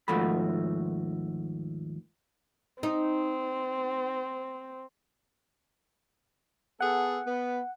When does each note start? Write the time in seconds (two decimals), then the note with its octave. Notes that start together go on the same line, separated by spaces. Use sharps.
0.08 D#2 G#2 F3 A3 F#4 B5
2.83 C4 D#4
6.81 B3 G#4 A4 F#5
7.27 B3